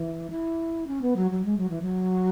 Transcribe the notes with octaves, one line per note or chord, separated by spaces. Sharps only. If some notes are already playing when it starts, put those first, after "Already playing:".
Already playing: E3
E4
C#4
B3
F#3
F#3
G#3
F#3
E3
F#3